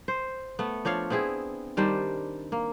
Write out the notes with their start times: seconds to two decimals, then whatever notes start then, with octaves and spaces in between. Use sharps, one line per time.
0.08 C5
0.59 A3 B3
0.85 F3 D4 C#5 F5
1.10 B3 C4 E4 G#4
1.77 D#3 G3 D4 C5
2.52 A#3